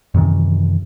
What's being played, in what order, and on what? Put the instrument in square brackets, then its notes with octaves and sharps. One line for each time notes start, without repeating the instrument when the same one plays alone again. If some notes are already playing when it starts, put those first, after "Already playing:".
[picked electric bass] F#2 C3 D#3 E3